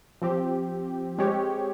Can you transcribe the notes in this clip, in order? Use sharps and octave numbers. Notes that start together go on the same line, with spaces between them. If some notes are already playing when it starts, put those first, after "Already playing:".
F3 C4 G4
G#3 C4 G4 C#5